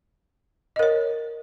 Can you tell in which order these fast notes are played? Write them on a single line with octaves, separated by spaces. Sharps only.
D#5 A#4 C#5